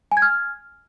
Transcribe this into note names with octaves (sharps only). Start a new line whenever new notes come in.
G#5
G#6
F6